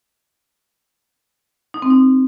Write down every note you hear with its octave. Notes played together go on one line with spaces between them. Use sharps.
D#4
C4
D#4